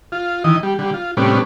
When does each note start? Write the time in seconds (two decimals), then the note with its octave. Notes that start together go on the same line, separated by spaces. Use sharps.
0.12 F4
0.44 D#3 E3 D#5
0.63 G3
0.79 D3 G3
0.94 F4
1.17 A2 C3 G3 B3 C#4 D4